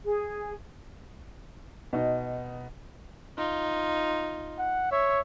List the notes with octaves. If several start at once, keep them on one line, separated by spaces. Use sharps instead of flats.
G#4
B2 D#4
D#4 F4
F#5
C#5 E5